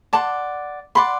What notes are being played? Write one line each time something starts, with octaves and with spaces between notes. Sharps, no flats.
D5 F#5 A5 C6
D5 F#5 B5 C6